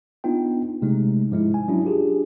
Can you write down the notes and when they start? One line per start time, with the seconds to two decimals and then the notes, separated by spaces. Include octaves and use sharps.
0.24 B3 D4 D#4 F4 G5
0.82 C3 G#3 A3 D#4
1.31 G#2 F3 G#3 D#4 E4
1.54 G#5
1.68 F#3 C#4 D4 E4 F#4
1.83 D4 F4 G4 G#4